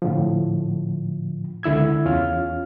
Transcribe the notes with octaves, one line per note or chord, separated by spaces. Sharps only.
A2 D3 F3
C#2 D3 E4 E6 G#6
E2 C#4 F4 F6